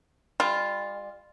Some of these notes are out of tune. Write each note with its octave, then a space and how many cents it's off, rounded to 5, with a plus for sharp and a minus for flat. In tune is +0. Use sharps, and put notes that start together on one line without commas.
G3 +40 F4 +0